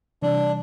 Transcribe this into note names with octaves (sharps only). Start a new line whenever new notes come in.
C3 E3 G3 D4